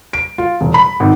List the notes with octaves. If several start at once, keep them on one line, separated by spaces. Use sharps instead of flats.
D7
F4
E1
B5
G#1